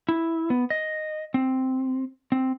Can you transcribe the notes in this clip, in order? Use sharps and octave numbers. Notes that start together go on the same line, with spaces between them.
E4
B3
D#5
C4
C4